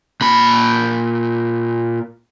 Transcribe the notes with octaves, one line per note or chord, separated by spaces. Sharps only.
A#2 B5